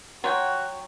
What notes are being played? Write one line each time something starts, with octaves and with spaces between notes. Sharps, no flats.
F#3 F#4 C#5 F#5 G5 C6